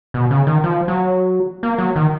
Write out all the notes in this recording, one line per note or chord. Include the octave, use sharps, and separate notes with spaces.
B2
C#3
D#3
F3
F#3
A#3
F#3
D#3